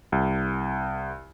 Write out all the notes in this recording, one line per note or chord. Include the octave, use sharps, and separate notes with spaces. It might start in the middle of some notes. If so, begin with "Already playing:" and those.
C2